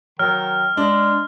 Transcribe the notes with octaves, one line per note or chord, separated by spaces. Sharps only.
D#3 F#3 F6
G#3 D4